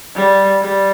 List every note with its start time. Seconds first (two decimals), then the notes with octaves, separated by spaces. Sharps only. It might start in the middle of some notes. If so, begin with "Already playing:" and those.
0.16 G3
0.62 G3